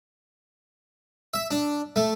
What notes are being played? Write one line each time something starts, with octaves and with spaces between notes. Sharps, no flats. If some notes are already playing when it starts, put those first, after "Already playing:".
E5
D4
A3